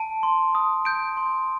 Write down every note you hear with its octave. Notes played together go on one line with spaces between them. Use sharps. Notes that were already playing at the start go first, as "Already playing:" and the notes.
Already playing: A5 D7
C6
D#6
G6 D7
C6